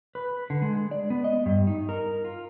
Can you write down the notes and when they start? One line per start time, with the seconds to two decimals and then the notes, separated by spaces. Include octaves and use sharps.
0.15 B4
0.50 D3
0.62 G#3
0.91 D5
1.10 B3
1.24 D#5
1.46 G2
1.67 D#4
1.89 A#4
2.25 F4